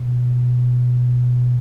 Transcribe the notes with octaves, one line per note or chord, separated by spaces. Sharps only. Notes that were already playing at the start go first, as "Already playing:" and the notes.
Already playing: B2